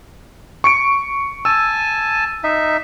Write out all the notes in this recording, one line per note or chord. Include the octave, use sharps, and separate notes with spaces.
C#6 C#7 D7
G#5 A5 E6
D#4 E5